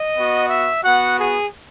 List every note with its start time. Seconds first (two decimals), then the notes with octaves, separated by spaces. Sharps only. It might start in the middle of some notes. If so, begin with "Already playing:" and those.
Already playing: D#5
0.14 B3 F#4
0.48 E5
0.82 B3 F#4 F#5
1.17 G#4